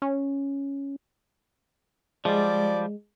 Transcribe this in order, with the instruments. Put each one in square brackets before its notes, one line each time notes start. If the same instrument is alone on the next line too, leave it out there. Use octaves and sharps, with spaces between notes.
[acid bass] C#4
[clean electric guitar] F3 G3 [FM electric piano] G#3 [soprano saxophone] D5